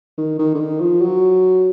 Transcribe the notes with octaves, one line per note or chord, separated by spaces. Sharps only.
D#3
D#3
D3
D#3
F3
F#3